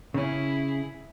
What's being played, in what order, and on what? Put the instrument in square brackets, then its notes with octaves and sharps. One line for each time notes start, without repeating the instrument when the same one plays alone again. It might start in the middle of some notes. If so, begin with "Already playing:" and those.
[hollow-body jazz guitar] C#3 C#4 [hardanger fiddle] E4 G#4